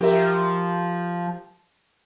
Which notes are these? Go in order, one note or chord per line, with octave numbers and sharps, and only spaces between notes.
F3 G4 A#4 E5